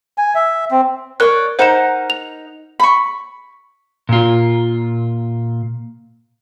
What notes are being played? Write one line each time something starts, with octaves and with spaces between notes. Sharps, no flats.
G#5
E5
C4
A#4 C#5 D5 F#6
D#4 A#4 C5 F#5 E7
F7
B5 C#6
A#2 F4